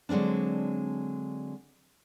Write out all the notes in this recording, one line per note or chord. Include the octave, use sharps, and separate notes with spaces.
D3 F#3 G#3 C4 D4